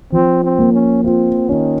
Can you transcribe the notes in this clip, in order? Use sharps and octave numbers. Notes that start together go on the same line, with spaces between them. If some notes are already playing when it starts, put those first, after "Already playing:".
F3 C4
C4
A#3
C#4
C4 F4
D#3 C#4